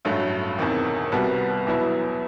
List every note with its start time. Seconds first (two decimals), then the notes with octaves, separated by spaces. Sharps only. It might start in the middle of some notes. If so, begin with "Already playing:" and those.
0.05 A1 G2 F#3 A3
0.59 E1 E2 C3 D#3
1.12 C2 B2 G3 B3 F#4
1.66 E2 B2 F#3 B3 E4